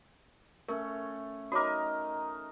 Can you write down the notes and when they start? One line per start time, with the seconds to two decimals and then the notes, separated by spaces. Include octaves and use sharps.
0.68 A3 C#4 A#4
1.52 D#4 F#4 A#4 C#5 D#5 D6